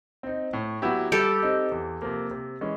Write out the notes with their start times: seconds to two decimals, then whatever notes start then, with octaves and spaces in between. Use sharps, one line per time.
0.23 C4 D#4
0.53 A2
0.82 F#3 B3 E4 G4
1.12 G3 G4 A4
1.43 C4 D#4
1.71 E2
2.02 C3 F3 A#3
2.31 C3
2.61 E3 G#3 C#4